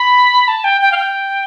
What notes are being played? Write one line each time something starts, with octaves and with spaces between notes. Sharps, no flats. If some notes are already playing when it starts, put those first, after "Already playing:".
Already playing: B5
A5
G5
G5
F5
G5